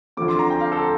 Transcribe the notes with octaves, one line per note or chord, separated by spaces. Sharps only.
D2 D3 F3 A3 C4 D6
C6
A#5
G5
F5
A4